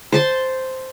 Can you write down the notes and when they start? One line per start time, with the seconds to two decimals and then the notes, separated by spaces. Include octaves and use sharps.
0.12 C5 A5 C6